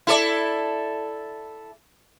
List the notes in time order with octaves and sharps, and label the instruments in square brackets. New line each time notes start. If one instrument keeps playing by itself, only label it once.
[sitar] E4 A4 D5